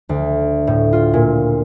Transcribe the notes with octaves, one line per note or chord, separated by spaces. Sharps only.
D2
A2
F4
A#2